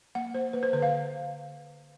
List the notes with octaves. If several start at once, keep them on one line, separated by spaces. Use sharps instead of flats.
A#3 F#5
A#3 C5
A#3 B4
C5
D3 B4
F5